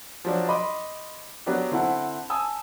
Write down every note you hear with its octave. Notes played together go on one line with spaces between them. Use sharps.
F3 F#3 D4
D#5 B5 C6 D6
F#3 B3 D4 G4
D3 C4 E4 F#5 A5
G#5 A5 D#6 E6